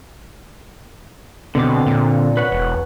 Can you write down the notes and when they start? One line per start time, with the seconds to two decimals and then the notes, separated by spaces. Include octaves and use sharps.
1.55 B2 D3 C4 D6
1.86 A#2
2.37 B4 C#5 F#5
2.52 E1